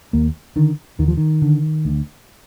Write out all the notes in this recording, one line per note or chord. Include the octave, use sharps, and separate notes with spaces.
D#2 A#3
D3 D#3
D#2 D#3
F3
D#3
D3
D2